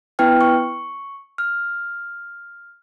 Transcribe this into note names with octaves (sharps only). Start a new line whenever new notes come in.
B3 E4 B4 G5 F6
C#6
F6